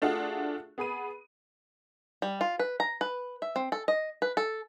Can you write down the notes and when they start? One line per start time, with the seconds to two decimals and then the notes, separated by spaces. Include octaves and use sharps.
0.02 A3 D4 F4 F#4 G#4
0.78 B3 G#4 B5 D#7
2.22 G3
2.41 F4
2.59 B4
2.80 A#5
3.01 B4
3.42 E5
3.56 C4
3.72 A4
3.88 D#5
4.22 B4
4.37 A4